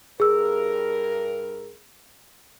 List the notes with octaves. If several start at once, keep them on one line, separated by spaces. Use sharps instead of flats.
G2 G#4 A#4 E6